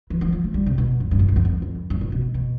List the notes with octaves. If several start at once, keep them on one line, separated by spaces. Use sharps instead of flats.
E3
F3
F3
A3
G3
C3
B2
G2
G2
A2
F2
E2
F2
F2
G2
A2
B2
B2